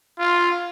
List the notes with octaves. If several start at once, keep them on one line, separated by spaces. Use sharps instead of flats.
F4